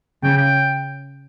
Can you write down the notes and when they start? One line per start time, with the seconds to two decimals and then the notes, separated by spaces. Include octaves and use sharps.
0.24 C#3 G5
0.37 G5